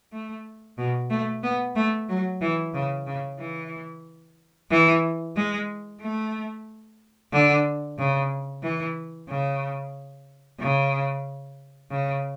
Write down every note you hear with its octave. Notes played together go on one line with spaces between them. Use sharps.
A3
B2
A3
B3
A3
F#3
E3
C#3
C#3
E3
E3
G#3
A3
D3
C#3
E3
C#3
C#3
C#3